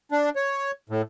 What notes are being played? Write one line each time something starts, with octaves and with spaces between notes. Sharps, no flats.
D4
C#5
A2